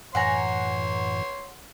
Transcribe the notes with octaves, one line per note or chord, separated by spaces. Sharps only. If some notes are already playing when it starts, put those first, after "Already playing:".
F#2 A2 E3 C#5 F#5 G#5 A#5 C6